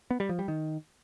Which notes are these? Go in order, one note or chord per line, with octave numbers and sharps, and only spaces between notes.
B3
G3
F3
G3
D#3